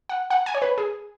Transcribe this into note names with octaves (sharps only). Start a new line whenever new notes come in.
F#5
F#5
G#5
C#5
B4
G#4